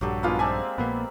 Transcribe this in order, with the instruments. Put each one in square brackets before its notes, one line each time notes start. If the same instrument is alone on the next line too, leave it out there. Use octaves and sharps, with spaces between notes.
[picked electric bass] A#1 G2 [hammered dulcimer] F#3 G4 A4
[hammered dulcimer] G#3 A#3 D#4 [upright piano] B3 F4
[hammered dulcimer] C4 D5 E5 [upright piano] G#5 A5
[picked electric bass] A#1 A#2 A#3 [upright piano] B3